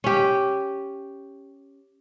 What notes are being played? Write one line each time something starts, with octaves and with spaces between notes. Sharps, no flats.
C#4 G4